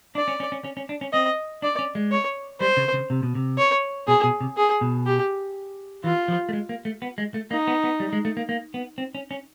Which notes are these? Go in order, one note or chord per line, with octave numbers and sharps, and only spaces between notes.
D4 D5
C#4
C#4
C#4
C#4
C#4
D4
C#4
C4 D#5
D4 D5
C#4
G#3
C#5
G3 C5
C#3
C#3
C3
B2
C3
C#5
B2 G#4
B2
C3
G#4
B2
G4
E3 F4
F3
A3
G#3
A#3
A3
B3
G#3
A3
A#3 D#4
B3
B3
G3
G#3
A3
A#3
A#3
B3
C4
C#4
C#4